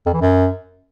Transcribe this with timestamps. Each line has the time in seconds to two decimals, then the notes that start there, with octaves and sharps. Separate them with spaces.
0.06 F2
0.14 E3
0.21 F#2